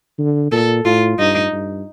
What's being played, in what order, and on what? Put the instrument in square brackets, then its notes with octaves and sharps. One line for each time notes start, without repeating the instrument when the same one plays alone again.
[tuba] D3
[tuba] A#2 [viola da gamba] A4
[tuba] A2 [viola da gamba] F4
[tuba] G2 [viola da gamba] D#4
[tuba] G2